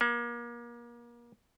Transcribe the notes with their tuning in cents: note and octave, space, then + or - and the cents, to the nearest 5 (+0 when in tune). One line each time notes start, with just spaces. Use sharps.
A#3 +35